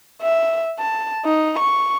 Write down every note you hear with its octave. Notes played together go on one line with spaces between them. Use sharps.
E5
A5
D#4
C#6